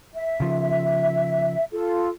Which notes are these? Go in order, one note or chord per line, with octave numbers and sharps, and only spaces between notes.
E5
C#3 F3
F4 A4